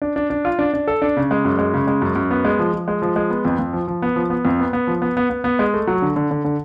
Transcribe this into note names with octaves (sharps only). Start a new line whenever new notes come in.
D4
D4
D4
F4
D4
D4
A4
D4
C#3
G#3
F#2
G#3
C#3
G#3
F#2
F#2
B3
G#3
F3
F3
G#3
F3
G#3
B3
F2
F2
F3
F3
B3
F3
B3
F2
B3
B3
F3
B3
B3
B3
B3
G#3
A3
F#3
D3
D3
D3
D3